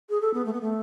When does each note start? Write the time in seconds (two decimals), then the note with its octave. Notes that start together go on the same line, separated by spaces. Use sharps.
0.09 G#4
0.21 A4
0.34 B3
0.45 A3
0.53 B3
0.61 A3